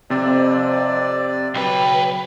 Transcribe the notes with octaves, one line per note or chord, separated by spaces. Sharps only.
F2 C3 C4 D5
B1 C#3 F#3 B4 G5